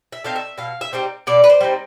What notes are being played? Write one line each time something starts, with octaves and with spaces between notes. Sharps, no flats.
E5
A3 C4 D#4 F5
E5
B2 F5
E5
G3 C4 D#4
B2 D5
B4
C5
G3 C4 D#4